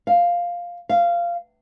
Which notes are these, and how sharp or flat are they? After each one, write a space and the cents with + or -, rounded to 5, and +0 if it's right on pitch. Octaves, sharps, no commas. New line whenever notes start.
F5 +0
F5 -15